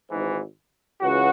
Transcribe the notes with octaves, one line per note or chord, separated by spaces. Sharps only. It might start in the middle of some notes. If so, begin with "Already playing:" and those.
G#1 G#2 E3
C#2 C#3 E3 F#4